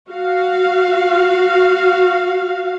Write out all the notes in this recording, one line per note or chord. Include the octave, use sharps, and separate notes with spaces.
F#4 F5